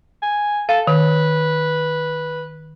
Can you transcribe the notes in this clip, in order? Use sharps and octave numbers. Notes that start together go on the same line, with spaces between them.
G#5
A4 F5
D#3 B4